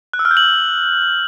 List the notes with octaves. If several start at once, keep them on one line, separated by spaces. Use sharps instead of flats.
F#6
E6
F6
G6
F#7